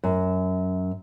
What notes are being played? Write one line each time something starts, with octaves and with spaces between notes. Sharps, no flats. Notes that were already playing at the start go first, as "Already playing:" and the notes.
F#2